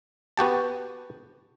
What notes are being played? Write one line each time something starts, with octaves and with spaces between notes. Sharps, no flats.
B3 F#4 G4 A5